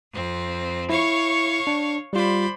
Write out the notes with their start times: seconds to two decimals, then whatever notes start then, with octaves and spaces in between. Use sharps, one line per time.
0.13 F2 C4
0.89 E4 C#5 F5 C#6
1.67 D4
2.13 G3 F4 C5 D5 B5